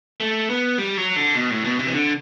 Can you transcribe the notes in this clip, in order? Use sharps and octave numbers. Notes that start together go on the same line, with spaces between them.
A3
B3
G3
F#3
D3
B2
A2
B2
C3
E3
D3